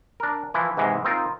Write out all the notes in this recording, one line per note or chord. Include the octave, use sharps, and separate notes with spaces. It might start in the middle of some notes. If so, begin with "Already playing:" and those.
D4 A#4
E3 F3 E4
G#2 C3 E3 G#3
C4 D#4 F4 A#4 C5